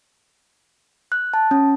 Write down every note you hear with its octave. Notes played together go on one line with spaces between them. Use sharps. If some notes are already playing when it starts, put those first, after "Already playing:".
F#6
A5
C#4